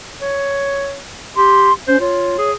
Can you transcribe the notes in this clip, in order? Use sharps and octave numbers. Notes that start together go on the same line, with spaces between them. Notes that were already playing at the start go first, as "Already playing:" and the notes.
C#5
G4 C6
C#4 C5
F4 C#5
G#4